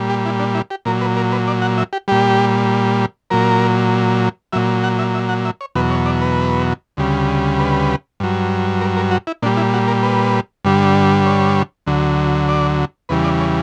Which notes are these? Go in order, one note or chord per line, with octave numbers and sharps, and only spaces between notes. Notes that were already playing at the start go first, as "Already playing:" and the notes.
Already playing: A#2 G3
G4
E4
D4
E4
G4
A#2 F#3 A#4
B4
A#4
B4
D5
F#5
E5
G4
A#2 G3 G4
A#2 F#3 A#4
A#2 F#3 E5
F#5
E5
E5
F#5
E5
C#5
E2 B2 F#3 B4
C#5
D5
B4
D2 C#3 G3
B4
G2 F#3
A#4
A#4
F#4
E4
A#2 G3 D4
E4
F#4
A#4
B4
G2 D3 G3
C#5
D2 D3 F#3
D5
E2 C#3 E3 G3 B4
D5
C#5